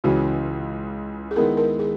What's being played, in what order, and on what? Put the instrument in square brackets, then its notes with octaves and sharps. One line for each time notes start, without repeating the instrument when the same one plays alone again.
[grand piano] C#2 C#3 E3 [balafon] F#4
[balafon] G#4
[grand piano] D#3 G#3 B3 E4 [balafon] A#4
[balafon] A#4
G#4